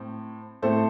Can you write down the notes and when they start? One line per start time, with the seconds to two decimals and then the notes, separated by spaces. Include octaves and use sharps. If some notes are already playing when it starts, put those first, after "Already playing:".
Already playing: A2 C4
0.62 A2 A3 C4 A4 C5